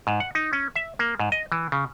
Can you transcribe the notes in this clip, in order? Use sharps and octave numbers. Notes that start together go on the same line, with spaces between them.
G#2
F#5
D#4
C#4
E5
A#3
G#2
D#5
E3
C#3